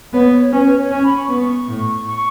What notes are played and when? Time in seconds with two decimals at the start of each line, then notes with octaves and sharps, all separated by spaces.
0.13 B3 C#5
0.33 C#5
0.52 C#4 B4
0.65 B4
0.78 C#5
0.91 C#4
1.04 B5
1.16 C#6
1.30 B3
1.68 A2
2.07 C#6